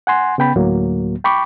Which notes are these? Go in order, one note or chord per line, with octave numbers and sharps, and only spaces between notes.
F#5 G#5 C6
C#3 B3 G5 B5
D2 A2 F#3 A#3
G5 B5 C#6 D6